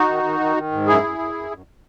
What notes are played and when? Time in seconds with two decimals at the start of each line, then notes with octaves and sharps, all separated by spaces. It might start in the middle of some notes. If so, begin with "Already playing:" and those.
Already playing: D#4 F#4
0.09 D#3
0.23 D#3
0.40 D#3
0.56 D#3
0.72 G#2
0.87 F#2 E4 G#4
1.03 F#2
1.18 F#2
1.34 F#2
1.51 F#2